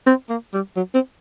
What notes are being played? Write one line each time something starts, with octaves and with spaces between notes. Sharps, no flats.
C4
A#3
G3
F#3
C4